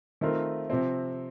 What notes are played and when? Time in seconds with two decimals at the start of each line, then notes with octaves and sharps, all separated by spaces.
0.21 D#3 A3 C4 F4 A#4
0.70 C3 F3 C4